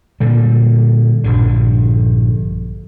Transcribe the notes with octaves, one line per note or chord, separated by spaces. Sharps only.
A#2 D3 G3
A#1 G2 D3